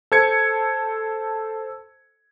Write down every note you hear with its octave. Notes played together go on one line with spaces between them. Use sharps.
A4 C5 G#6 C#7